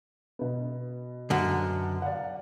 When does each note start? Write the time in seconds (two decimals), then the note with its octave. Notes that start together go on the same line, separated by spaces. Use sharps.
0.39 B2 B3
1.30 F#2 D3
2.02 D5 F5 F#5